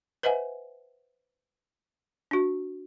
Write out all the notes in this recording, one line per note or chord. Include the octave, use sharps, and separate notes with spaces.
B4 C5 D#5 E5 F#5 G#5
D4 F#4